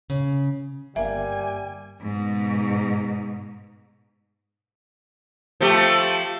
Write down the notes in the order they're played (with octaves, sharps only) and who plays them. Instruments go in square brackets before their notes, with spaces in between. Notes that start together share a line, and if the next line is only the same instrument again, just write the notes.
[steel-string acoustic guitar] C#3
[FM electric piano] G1 A#3 [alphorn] G3 [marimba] E5 [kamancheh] G#5
[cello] G#2 B2
[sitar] F3 A3 G4